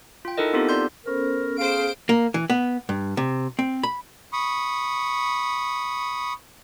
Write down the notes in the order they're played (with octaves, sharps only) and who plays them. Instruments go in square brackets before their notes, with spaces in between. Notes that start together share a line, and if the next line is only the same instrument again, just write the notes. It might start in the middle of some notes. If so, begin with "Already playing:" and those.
[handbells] F4 G5
D#4 E4 A4 A#4 D#5
B3 C4 D#4 F4 G4 A4
D5 C6 G6
[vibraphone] B3 C#4 A4 [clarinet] A#4 [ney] C5
[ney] G#4 [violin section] C5 D7 [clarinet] F5
[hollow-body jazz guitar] A#3
E3
B3
G2
C3
C4
B5
[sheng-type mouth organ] B5 C#6 D#6